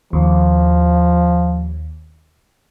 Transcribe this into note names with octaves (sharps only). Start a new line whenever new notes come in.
D#2 F3